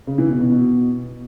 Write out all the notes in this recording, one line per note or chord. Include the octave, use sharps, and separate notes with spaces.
C#3
E3
B2
B2
B2